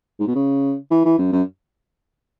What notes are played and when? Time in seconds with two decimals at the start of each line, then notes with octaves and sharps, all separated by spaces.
0.20 G#2
0.27 B2
0.35 C#3
0.91 E3
1.05 E3
1.18 F#2
1.32 F#2